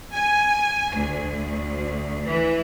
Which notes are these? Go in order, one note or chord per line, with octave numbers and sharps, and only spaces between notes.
G#5
D2
E3